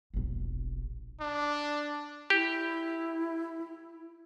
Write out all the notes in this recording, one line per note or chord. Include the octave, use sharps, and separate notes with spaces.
E1 A#1
D4
E4 G4